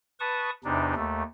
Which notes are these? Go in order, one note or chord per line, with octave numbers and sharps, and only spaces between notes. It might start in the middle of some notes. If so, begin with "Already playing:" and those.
B4 A5 C#6 D#6
E2 C3 D4 D#4
D#2 A3